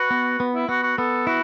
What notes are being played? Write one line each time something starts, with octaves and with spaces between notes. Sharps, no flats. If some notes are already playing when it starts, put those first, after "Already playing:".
Already playing: F#4 B4
B3
B3
E4
B3 F#4
F#4
B3 A4
E4 F#4